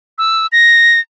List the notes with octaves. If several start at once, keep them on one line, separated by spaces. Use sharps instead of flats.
E6
A#6